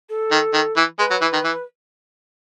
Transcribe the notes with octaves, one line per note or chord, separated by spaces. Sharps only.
A4
D#3
D#3
E3
G#3 B4
F#3
E3
D#3
E3